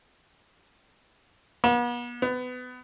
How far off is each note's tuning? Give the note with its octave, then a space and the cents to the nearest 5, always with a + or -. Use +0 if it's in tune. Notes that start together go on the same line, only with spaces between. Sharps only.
B3 -40
B3 +25